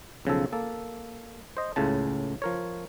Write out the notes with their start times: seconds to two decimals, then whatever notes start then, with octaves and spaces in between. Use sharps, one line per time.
0.25 B1 C#3 F3 A4
0.53 A#3 A4
1.57 C5 D#5
1.76 C#2 A2 C#3 A5
2.42 F3 A#4 C#5